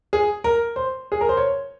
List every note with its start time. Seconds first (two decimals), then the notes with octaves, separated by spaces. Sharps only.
0.13 G#4
0.44 A#4
0.76 C5
1.12 G#4
1.21 A#4
1.29 C5
1.37 C#5